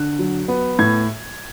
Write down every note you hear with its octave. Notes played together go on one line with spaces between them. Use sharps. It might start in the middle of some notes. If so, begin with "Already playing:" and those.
Already playing: D3 F#6
F#3
B3
A2 G#6